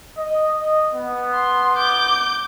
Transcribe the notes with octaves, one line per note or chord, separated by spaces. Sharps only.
D#5
D#5
B3
C6
D6 G6